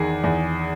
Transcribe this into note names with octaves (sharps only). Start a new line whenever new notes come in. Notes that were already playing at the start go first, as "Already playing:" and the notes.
Already playing: E2 D#3 G#4
E2